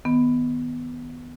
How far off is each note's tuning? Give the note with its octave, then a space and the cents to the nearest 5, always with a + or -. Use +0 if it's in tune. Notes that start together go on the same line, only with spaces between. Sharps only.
D#3 +0 B3 +0